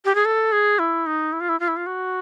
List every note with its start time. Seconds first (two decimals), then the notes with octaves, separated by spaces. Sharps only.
0.05 G4
0.15 G#4
0.25 A4
0.52 G#4
0.79 E4
1.06 D#4
1.33 E4
1.40 F4
1.49 E4
1.60 F4
1.68 E4
1.76 F4
1.86 F#4